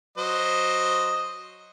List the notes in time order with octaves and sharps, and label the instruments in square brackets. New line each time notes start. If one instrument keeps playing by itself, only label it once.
[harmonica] F#3 C5 D#5